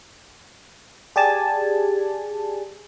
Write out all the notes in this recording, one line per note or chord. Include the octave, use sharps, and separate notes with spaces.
G4 G#4 D5 G#5 A5